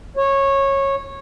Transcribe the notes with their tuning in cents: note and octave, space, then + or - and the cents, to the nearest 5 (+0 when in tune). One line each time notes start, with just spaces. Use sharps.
C#5 -15